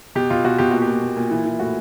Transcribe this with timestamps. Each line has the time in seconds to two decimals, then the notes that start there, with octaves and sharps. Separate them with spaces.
0.15 B2 G4
0.30 B2 F4
0.44 B2 F#4
0.58 B2 G4
0.71 A#2 F#4
0.82 G4
0.88 A#2
1.02 A#2
1.16 A#2
1.31 E3
1.45 E3
1.60 A2 F#4